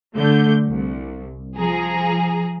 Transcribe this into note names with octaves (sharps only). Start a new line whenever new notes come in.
D3 A3 G6
C2
F3 G#4 A#5